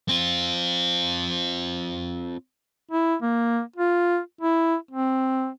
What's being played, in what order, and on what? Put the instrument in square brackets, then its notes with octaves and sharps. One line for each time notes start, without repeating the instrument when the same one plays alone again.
[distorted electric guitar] C4 F4
[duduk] E4
A#3
F4
E4
C4